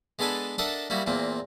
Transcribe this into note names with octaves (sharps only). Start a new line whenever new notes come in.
G#3 B3 D4 A4 G#5 B5
D4 A4 A#4 D#5 E5 F#5
G3 A#3 E4 F#4
E2 A#2 A#3 C4